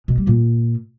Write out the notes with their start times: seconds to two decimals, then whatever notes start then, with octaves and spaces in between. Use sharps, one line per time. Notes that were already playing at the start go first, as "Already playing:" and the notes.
0.08 B2
0.18 G3
0.27 A#2